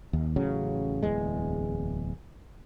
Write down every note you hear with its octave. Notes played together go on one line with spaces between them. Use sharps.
D#2
A1 C#3 F#3
D1 E2 G#3